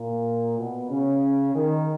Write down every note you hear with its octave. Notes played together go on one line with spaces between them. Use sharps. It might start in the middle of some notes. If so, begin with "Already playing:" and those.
Already playing: A#2 A#3
B2 B3
C#3 C#4
D#3